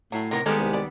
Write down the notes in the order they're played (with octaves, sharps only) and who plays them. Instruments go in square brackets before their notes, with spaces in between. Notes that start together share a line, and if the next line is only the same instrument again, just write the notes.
[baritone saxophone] A2 [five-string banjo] F#3 A3
[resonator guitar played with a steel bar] C3 A#4 [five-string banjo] D#3 B3 C#5
[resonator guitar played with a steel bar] D#3 G3 B3 [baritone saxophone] G#3 [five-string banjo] C4 D#4 G4 [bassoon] A4
[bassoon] C2
[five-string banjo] D5 B5